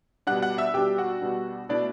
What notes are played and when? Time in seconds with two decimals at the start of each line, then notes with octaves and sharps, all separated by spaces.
0.27 B2 G3 D4 F#5 F#6
0.42 F#5 F#6
0.58 E5 E6
0.74 B2 G3 D4 G4 G5
0.98 F#4 F#5
1.21 B2 G3 D4
1.69 B2 A3 D4 E4 D5